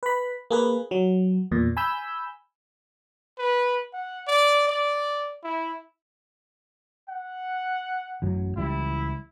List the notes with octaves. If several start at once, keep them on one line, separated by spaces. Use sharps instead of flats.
B4 B5
A#3 G#4 B4
F#3
E2 A#2
G#5 B5 E6 G6
B4
F#5
D5
D5
E4
F#5
A1 F#2 F#3
C#2 E3 G3 E4